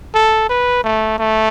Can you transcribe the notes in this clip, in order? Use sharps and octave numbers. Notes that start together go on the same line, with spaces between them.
A4
B4
A3
A3